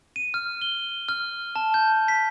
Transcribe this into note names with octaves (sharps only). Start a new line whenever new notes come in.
D#7
F6
G7
F6
A5
G6
B6